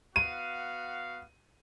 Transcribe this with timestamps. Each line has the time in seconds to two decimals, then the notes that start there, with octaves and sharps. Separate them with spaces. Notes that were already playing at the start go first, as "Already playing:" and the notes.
0.16 B3 F#4 F5 D#7